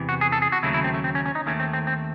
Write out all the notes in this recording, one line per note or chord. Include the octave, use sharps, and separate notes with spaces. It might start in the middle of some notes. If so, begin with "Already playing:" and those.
Already playing: E2 C3 E3
F#4
G#4
A4
G#4
F#4
D#2 C#3 F#3 A3 E4
E4
C4
A3
C4
C#4
C#4
D#4
D#2 D#3 A3 C#4
C4
C4
C4